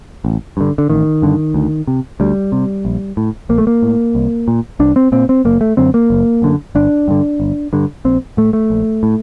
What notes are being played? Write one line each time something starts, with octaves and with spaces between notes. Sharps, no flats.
A1
G2 D3
D3
A1 D#3
G2 D3
D2
C3
D2 G3
C3
A#1
A2
A#1 A#3
A3
A#3
A2
C2
A#2
C2 D4
C4
A#2 C4
C4
F#1 A#3
A3
F#2 D3 C4
A#3
F#1
F#2 D3
G1 D4
G2 D3
G1
G2 D3
A#1 C4
A2 A3
A3
A#1
A2